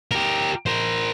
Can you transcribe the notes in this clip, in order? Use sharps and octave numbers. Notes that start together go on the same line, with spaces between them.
G4 A#4
A#4 C5